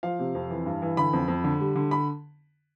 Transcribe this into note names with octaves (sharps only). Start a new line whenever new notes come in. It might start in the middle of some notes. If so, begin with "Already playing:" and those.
F3 F5
C3
F2
E3
G2
E3
D3 B5
F2
F2
D3
G3
D3
B5